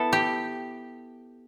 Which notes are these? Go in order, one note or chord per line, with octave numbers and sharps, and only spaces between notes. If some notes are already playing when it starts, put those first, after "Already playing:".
Already playing: B3 E4 A4
G4